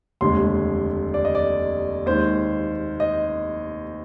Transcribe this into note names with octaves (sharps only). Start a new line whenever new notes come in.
F1 D#2 D3 G#3 C6
D5
D#5
D5
D#2 D#3 G#3 C5
D#5